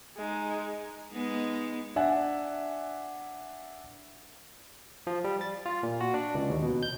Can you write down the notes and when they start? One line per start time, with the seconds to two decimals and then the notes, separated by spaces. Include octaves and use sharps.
0.17 G#3 D#4
1.11 G#3 B3 D#4
1.96 D4 E5 F#5 G#5
5.07 F3
5.24 G3
5.41 A6
5.66 F4
5.83 A#2
6.00 F#4
6.14 D4
6.35 C#2
6.50 D#2
6.62 B2
6.83 G6